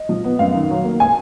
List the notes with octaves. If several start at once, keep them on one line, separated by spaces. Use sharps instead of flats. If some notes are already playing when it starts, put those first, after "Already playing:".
Already playing: D#5
F3
B3
F#2 F5
D#3
F#3
A#3
G#5